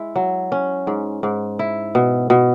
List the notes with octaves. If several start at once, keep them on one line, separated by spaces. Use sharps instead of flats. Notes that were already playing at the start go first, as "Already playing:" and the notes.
Already playing: G#3 E4
F#3
C#4
G#2
G#2
E4
B2
B2